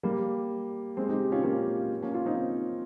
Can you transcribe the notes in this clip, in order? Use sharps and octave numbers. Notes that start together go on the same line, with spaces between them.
G3 A#3
G#3 C4
D#4 G4
C#4 F4
A#3 C#4
A#3 C#4
C#4 F4
C4 D#4